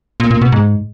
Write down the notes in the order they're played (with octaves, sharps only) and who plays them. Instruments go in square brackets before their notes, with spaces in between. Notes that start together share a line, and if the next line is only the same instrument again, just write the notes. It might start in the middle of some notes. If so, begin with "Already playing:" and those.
[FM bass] A#2
A#2
B2
G#2